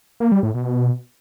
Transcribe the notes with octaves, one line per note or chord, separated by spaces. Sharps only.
A#3
G3
A2
B2